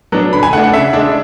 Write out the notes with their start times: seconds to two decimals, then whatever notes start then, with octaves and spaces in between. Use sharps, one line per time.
0.12 F#3 B3 D4
0.33 D3 B5
0.43 G#5
0.53 A3 D4 F#5
0.63 F#5
0.73 C#3 E5
0.93 G#3 D4